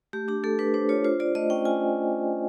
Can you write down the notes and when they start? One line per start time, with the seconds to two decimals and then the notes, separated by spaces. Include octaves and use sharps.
0.13 A3 G4
0.28 D4 G4
0.44 A3 A4
0.59 D4 B4
0.74 D4 C5
0.89 F4 C#5
1.04 F4 C5
1.20 F4 D5
1.35 A3 D#5
1.50 C#4 G5
1.65 F4 G#5